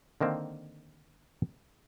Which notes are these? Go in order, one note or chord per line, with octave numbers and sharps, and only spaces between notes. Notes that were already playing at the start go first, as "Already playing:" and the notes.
D3 D#3 A#3 C4